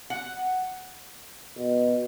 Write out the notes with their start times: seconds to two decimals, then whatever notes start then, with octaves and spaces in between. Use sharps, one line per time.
0.10 F#5
1.58 B2